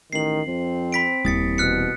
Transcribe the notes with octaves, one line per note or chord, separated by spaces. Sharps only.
A1 D#3 C7 F#7
F2 C4
B5 B6 D7
D#1 C2 E3 D#6 A6 C#7
B2 F6 F#6 C#7